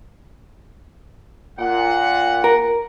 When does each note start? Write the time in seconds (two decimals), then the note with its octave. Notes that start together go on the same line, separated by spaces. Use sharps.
1.58 A#2 F#5
2.44 A#4